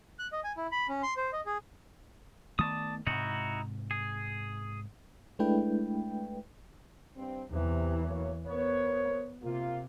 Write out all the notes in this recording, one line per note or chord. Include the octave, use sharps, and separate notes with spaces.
F#6
D#5
G#5
E4
B5
C#4
C6
C5
D#5
G#4
D#3 A3 B3 D5 A5 D#6
G#2 C3 D#4 E4 F#4
G#4
G#3 A3 D4 E4 B4 G5
G2 C4
E2 C3 E3
F#3 A#3 C#5
B3 A#4 C5 C#5
C3 A#3 F4